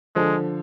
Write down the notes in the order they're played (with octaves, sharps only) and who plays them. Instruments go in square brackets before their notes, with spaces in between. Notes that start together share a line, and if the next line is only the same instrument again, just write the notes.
[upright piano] D3 F3 [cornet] G#3